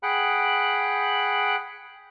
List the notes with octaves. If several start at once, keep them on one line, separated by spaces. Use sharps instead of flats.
G#4 F#5 G5 B5 F#6